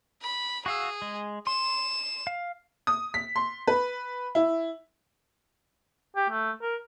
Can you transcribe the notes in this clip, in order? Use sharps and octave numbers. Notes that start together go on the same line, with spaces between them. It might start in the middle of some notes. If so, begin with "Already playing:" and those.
B5
F#4 G#4 F5 E6
G#3
C6 E7
F5
D#6
B6
C6
B4
E4
G4
A3
A#4